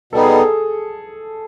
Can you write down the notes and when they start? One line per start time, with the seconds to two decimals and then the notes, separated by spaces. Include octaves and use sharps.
0.13 B2 G3 B3 D#4 A4
0.23 G#4
0.34 A4